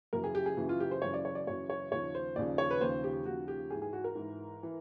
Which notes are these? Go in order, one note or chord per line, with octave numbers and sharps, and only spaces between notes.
F#2 C#3 E3 A#4
G#4
G4
G#4
F#2 C#3 E3
F4
G4
C5
F#2 C#3 E3 C#5
D5
C#5
D5
F#2 C#3 E3 C#5
C#5
D#2 C#3 F3 C#5
C5
D#2 C#3 F3 D5
C#5
B4
D#2 C#3 F3 C5
G4
D#2 C#3 F3 F#4
G4
G#2 E3 G#4
G#4
F#4
A#4
G#2 E3
E3